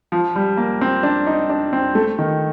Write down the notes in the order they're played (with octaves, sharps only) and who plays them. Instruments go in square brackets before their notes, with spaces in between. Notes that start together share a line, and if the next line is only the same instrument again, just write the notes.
[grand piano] F3
G3
A#3
C4
D4
D#4
D4
C4
A3
D#3